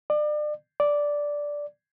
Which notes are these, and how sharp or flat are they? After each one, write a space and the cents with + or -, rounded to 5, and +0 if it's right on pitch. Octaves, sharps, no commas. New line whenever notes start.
D5 +35
D5 -5